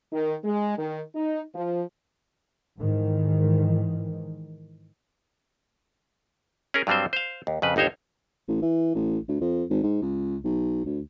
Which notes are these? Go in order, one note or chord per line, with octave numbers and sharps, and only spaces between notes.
D#3
G#3
D#3
D#4
F3
G#2 D#3 E3
C#4 G#4 A#4
G2 F#3 G3 C4 C5
C5 F5
D#2
F2 C#3 B4
G1 D#2 D#4 C5 C#5
A1
E3
A1
D2
F2
G#1
G#2
C#2
B1
D2